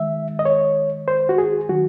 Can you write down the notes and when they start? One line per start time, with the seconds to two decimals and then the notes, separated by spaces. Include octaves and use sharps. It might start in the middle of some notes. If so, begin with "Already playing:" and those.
Already playing: D#3 G#3 E5
0.39 D#5
0.45 C#5
1.08 C5
1.29 F#4
1.38 G#4
1.69 D#3 F#3 F#4